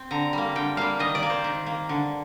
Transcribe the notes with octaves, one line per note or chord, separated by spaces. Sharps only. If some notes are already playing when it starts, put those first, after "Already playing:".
Already playing: C4
D3 A#5
G3 A#3
D3 G5
G3 A#3 F5
D#3 D#5
D5
A#3
C5
D#3
A#3
D3